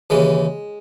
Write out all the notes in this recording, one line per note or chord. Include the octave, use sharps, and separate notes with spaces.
D#2 C#3 E3 G#3